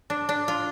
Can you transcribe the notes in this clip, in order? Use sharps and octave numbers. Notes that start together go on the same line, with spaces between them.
D4
D4
F4